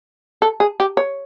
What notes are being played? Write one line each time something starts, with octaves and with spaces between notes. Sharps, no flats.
A4
G#4
G4
C#5